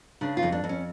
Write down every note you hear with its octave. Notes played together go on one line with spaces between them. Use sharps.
C#3 D4
F4
F2
D4
F2
C#4